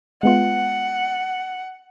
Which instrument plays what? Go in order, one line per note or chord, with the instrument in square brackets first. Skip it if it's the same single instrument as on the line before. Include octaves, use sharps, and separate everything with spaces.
[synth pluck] G#3 B3 F4 [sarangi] F#5